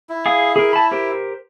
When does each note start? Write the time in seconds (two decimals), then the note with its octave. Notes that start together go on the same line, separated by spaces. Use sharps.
0.09 E4
0.26 G#4 F5 D#6
0.56 G#4 A#4
0.73 A5 B5
0.91 G4 A#4 C5